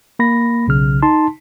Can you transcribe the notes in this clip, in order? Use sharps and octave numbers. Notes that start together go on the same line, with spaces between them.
A#3 B5 A#6
B1 C#3 F6
D#4 A5 C6